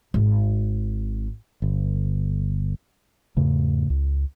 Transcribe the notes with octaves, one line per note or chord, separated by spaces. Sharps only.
G#1
G1
E2 G#2 C#3 A3
C#2